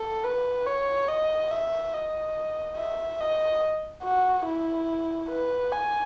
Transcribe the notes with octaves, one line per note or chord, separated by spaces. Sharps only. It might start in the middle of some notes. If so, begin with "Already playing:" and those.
Already playing: A4
B4
C#5
D#5
E5
D#5
E5
D#5
F#4
E4
B4
G#5